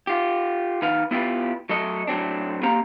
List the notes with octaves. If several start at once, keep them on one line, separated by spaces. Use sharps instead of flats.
F4 G4
D#3 B4 F5
B3 E4 F4 G4 B4
F#3 A3 A4 D#5
A2 F#3 C4 D4
A#3 C4 G4 F5 A#5